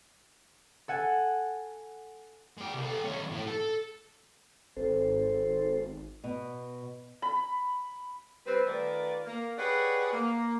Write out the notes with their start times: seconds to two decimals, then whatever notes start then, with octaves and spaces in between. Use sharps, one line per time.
0.88 A4 F#5 G#5
2.58 G#3 D5
2.73 C2
2.85 G4 A4
3.04 D#2 C#4
3.31 A2
3.47 A4
4.76 G#1 C4 A4 C5
6.24 B2
7.22 B5
8.46 G3 C4 B4
8.66 D#3 A3 F4 A#4 B4 D5
9.25 A#3
9.58 G4 G#4 B4 C#5 D5 F#5
10.12 A#3